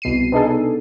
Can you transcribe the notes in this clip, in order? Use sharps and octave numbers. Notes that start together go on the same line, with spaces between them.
C2 B2 C7 D#7
B3 D4 D#4 G#4 A4